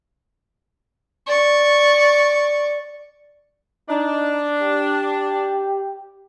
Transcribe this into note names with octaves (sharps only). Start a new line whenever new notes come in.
D5 C#6
D4 D#4
G4